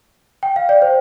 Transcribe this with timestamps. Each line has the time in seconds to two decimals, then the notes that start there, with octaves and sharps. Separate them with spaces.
0.43 G5
0.56 F5
0.69 D5
0.82 C5